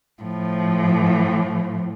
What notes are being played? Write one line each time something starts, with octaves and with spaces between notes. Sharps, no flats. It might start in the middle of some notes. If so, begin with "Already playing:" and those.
A2 F3